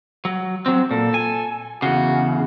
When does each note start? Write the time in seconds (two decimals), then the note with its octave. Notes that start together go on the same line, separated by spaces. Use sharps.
0.25 F#3
0.66 F#3 C4
0.91 A#2 A4
1.14 G#5
1.82 E2 C#3 F#4